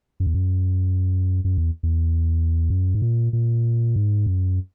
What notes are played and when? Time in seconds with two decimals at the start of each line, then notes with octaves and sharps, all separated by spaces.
0.20 F#2
0.27 E2
0.34 F#2
1.44 F#2
1.58 E2
1.83 E2
2.70 F#2
2.95 G#2
3.02 A#2
3.33 A#2
3.96 G#2
4.26 F#2